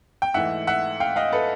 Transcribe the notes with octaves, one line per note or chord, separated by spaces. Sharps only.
G5
G#2 E3 A3 E5 F#5
E5 F#5
F5 G5
D#5 F5
A4 B4